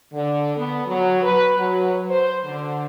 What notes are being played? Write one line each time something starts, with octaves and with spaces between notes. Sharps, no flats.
D3
B3
F#3
B4
F#3
C5
D3